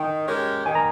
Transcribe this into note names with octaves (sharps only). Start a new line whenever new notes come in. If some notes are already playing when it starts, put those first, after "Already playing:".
Already playing: D#3 G5
G#3 C#4 G4 A#4
D#3 G#5
A#5